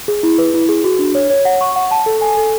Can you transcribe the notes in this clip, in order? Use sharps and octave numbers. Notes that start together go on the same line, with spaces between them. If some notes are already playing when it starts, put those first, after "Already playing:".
G#4
E4
B4
E4
G#4
F#4
D4
C#5
C#5
F#5
C#6
F#5
A5
A4
G#5
A4